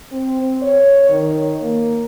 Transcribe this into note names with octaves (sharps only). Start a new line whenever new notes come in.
C4
C#5
D#3
A#3